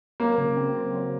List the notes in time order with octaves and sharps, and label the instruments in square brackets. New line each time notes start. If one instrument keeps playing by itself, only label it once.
[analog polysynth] F#3 [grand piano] A#3
[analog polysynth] C#3
C4
C4
F#3